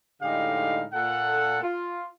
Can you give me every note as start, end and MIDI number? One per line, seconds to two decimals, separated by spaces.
0.22 0.85 45
0.22 0.85 50
0.22 0.85 56
0.22 0.85 63
0.22 0.85 67
0.22 0.85 77
0.93 1.62 46
0.93 1.62 69
0.93 1.62 78
1.63 2.06 65